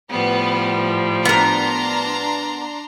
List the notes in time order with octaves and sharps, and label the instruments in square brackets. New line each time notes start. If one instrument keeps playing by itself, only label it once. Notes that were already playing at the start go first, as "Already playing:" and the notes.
[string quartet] A2 F3 G3 [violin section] B3
[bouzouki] B3 A#4 [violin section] D4 A#5 C6